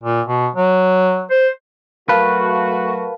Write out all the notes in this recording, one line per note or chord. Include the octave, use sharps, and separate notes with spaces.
A#2
B2
F#3
C5
F#3 A3 F#4 A#4 B4 F5 A5